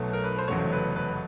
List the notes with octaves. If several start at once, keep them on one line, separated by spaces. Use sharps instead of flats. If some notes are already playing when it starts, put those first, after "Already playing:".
Already playing: B1 B2 F#3 A3
A#4
B4
C5
F1 E2 C#3 F#3 A3 C#5
B4
B4